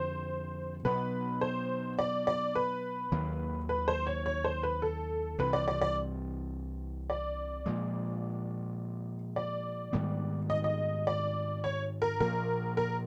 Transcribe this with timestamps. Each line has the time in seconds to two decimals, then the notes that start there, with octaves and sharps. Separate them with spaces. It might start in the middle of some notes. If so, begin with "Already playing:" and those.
Already playing: F2 D3 F3 C5
0.85 B2 F#3 B3 B4
1.41 C5
1.99 D5
2.27 D5
2.55 B4
3.12 D#2 D#3 F#3 A#3
3.69 B4
3.88 C5
4.07 C#5
4.26 C#5
4.45 C5
4.63 B4
4.82 A4
5.38 C2 C3 E3 B4
5.53 D5
5.68 D5
5.81 D5
7.10 D5
7.66 A#2 F3 G#3
9.36 D5
9.93 G#2 D#3 G3 B3
10.50 D#5
10.64 D#5
11.07 D5
11.64 C#5
12.02 A#4
12.20 A#2 F3 A#3 A#4
12.77 A#4